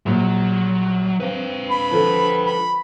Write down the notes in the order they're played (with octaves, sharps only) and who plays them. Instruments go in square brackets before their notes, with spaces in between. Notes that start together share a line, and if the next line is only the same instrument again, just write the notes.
[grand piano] A#1 [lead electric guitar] F#3
[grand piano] C4 [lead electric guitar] B4 F5
[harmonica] B5
[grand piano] D3 F3
[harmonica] B5